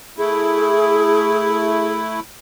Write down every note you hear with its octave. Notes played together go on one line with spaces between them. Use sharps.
A3 E4 G#4